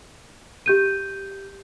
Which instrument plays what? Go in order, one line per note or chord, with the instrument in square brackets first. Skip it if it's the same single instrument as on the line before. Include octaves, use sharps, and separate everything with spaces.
[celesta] G4 G6 D#7